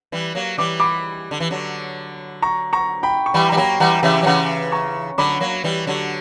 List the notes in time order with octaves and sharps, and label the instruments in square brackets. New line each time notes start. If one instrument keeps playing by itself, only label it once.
[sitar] E3 G3
F#3 A#3
[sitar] E3 G3 [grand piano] D6
[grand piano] B5 D6
[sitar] D3
E3
D3 F#3
[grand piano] A#5 C#6
A#5 C#6
G5 B5
C#6
[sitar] E3 G3 [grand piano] G5 B5
[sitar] G3 [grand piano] A#5
[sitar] F#3 A#3 [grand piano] G5 B5
[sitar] E3 G3 [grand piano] F#5 A#5
[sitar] C#3 E3 [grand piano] E5 G5
[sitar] F#3
[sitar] C#3 E3 [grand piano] F#5 A#5
[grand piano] A#5 C#6
[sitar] D3 F#3 [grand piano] B5 D6
[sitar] F#3 A#3
E3 G3
D3 F#3